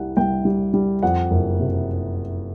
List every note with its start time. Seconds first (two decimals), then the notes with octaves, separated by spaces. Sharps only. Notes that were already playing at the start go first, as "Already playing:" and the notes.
Already playing: C2 G3 F#5
0.17 C2 G5
0.45 G3
0.74 G3
1.03 F2 F#5
1.31 F#1
1.60 C3